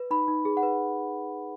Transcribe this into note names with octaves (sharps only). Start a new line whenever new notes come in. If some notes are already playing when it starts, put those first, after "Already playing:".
Already playing: B4
D#4 B5
D#4
G#4
F#5
B4